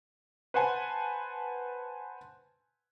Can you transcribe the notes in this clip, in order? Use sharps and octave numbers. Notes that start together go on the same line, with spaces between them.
B4 C5 F#5 G#5 A5